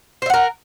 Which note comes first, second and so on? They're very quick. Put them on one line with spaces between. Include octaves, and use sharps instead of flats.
C5 E5 F#5 A#4